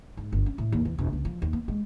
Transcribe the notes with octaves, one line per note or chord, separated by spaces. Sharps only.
G#2
G1
C#4
A2
D#2
E2
E1
C#2
F3
D#2
B3
G#3